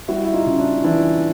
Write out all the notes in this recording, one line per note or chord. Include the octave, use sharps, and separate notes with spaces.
G3 E4 F#4
E4
D#4 F4
C#3
D4 E4
E3 D4 E4